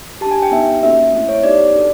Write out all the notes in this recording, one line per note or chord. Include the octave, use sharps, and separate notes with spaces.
D4 G4 A5
G#5
G5
B3 D#4 G4 E5
A#3 C#4 F#4 A4 E5
A3 C4 E4 E5
C#5
B3 D#4 G4 D5
D4 F#4 A4